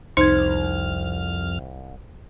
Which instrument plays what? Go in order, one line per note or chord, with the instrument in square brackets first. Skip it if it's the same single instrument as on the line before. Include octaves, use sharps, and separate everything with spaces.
[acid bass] C2 [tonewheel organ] F2 F6 [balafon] D#4 [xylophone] C5 G#6